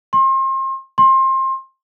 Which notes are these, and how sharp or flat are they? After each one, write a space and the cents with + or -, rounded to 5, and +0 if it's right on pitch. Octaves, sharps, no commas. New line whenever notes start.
C6 +35
C6 +25